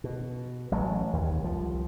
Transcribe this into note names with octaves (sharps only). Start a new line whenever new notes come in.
B2
A1 F#3 A3
D#2
C2 F3